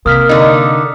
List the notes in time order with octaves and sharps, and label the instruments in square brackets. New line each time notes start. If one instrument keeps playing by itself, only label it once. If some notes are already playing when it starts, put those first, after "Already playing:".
[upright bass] C3 [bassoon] A#3 [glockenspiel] D#6 F6 B6
[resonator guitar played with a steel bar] D3 D#4